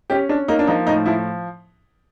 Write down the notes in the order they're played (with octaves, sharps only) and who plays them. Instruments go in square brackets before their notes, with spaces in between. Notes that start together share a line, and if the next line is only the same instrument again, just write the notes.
[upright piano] C#4 [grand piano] G4
[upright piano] C#4 [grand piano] D4
[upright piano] A#3 [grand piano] D#4
[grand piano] D4
[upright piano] F3 [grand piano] D#4
[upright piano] A2 [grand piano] D#4
[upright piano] F3 [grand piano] E4